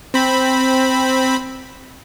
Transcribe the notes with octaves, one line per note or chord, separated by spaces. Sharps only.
C4 B5